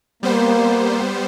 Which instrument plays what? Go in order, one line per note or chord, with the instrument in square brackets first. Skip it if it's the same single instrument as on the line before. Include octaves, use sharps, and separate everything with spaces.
[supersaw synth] G3 B3 C5 [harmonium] A#3